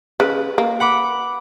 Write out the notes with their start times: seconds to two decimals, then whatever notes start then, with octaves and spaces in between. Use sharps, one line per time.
0.20 C#3 B4
0.58 A#3
0.80 F#5 B5 D6